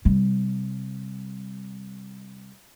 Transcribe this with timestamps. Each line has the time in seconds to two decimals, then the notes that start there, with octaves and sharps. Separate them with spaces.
0.05 C3 G3